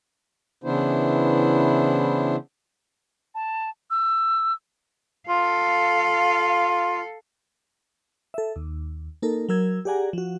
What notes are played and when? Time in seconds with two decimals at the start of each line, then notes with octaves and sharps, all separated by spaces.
0.64 C#3 E3 B3 D4 E4 C5
3.35 A5
3.91 E6
5.29 F4 A4 F5
8.34 A4 E5
8.56 D#2
9.22 A#3 D#4 A4 A#4
9.49 F#3 A#4 E6 G#6
9.85 G4 G#4 D5 F#5 G#5 A#5
10.13 F3 F#4